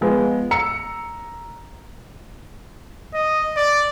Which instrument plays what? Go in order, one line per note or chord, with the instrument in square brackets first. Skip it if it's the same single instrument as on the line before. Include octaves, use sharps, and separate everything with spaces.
[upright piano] F3 G#3 B3
A#5 E6 C#7
[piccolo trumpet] D#5
D5